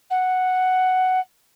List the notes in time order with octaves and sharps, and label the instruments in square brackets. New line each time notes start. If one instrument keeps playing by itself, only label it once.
[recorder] F#5